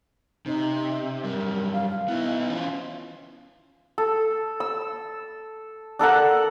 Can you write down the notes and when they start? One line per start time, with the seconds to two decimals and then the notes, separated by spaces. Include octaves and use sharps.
0.46 C3 D#4
1.24 F#2 G3 A#4
1.73 F5
2.08 B3 D#4 E4
2.50 E3 C#4 F4
3.98 A4
4.60 E6
5.99 D4 A4 A#4 F#5